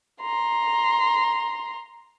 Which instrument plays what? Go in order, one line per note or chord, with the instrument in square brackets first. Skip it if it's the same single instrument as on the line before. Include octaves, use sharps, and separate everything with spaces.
[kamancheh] A#5 C6